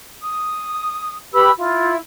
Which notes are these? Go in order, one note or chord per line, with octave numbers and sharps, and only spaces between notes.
D#6
G4 B4 B5 E6
E4 F4